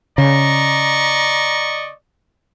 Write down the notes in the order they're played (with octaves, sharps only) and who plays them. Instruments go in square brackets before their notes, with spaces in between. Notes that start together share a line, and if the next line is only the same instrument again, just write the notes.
[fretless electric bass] C#3 [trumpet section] D5 D#5 C#6 [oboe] A#5